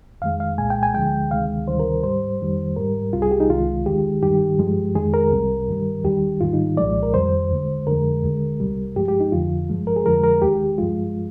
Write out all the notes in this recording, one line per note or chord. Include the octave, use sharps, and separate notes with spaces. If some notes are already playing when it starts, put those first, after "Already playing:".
F2 D#3 G#3 F5
F5
C2 A#2 G#3 G#5
G5
G#5
D2 D3 F3 G#3 G5
D2 C3 D#3 G#3 F5
D2 C3 D#3 G3 C5
A#4
G#2 G3 C5
F2 D#3 G3
G#2 G3 A#4
C2 C3 G3 F4
G#4
G4
D#4
C2 C3 D#3 G#3 F4
D#2 D#3 G#3 G4
G2 D#3 G3 G4
G2 F3 G#3
F2 D#3 G#3 G#4
A#4
C2 C3 G3
G2 D#3 G3
D#2 D#3 G3 G4
G#2 D#3 G3 F4
D#4
C2 A#2 F3 G#3 D5
A#4
F2 D#3 G3 C5
D#2 D3 G#3
F2 D3 F3 G#3 A#4
D#2 D3 G#3
C2 C3 G3
G2 F3 G#3 G4
G4
D#4
F2 D3 F3 F4
G2 F3 G#3
A#4
G#4
F2 D3 F3 G#3 A#4
A#4
D#2 D#3 G#3 G4
G2 F3 G#3 F4